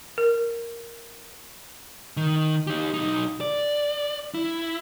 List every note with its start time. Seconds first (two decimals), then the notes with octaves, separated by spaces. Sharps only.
0.18 A#4
2.17 D#3
2.67 D#4 G4
2.94 B1 D#4
3.41 D5
4.34 E4